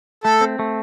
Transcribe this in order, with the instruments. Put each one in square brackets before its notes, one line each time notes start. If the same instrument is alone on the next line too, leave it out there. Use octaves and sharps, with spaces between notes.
[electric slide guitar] A3 [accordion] A4
[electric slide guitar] C4
A3